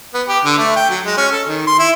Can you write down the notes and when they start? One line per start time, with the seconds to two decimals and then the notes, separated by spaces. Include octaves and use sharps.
0.14 B3
0.27 G4
0.45 D3
0.58 A3
0.76 G5
0.90 F#3
1.05 G#3
1.17 C#4
1.31 A4
1.47 D#3
1.67 C6
1.79 E4